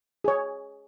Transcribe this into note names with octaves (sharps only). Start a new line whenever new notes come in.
G#4 C#5